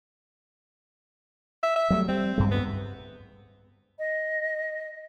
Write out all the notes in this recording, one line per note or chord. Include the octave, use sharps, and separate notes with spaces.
E5
E5
F#3 G3 A3
G3 C4
D2 G2 G#3
B3
D#5